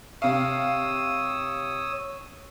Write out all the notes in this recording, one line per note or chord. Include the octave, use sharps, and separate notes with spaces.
C3 C#5 F5 D#6 E6